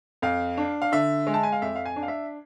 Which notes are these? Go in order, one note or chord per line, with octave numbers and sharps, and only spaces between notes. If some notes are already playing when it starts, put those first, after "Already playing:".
F2 F5
D4
F5
D3 E5
G#3
A5
G#5
F5
F2 E5
F5
G#5
D4
F5
E5